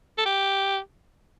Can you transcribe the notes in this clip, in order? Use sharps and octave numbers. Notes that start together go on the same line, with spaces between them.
A4
G4